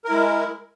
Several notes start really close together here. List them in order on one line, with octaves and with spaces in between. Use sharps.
A#4 E4 G#3